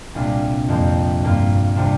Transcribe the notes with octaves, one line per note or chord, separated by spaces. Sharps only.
C2 A#2 G3 D4 F4
F2 F3 A#3 G4
G2 G3 A#3 F4
C3 G3 D4 F4